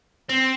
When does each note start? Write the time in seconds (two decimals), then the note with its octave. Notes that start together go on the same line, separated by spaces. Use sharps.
0.29 C4